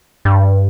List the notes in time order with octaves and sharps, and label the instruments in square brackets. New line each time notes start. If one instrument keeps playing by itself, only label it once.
[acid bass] G2